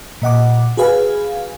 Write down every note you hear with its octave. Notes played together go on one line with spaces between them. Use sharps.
A#2 D#5 F#5 D6
F#4 G#4 B4 F5 G#5